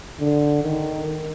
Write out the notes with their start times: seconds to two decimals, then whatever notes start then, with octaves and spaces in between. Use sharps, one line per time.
0.20 D3
0.64 D#3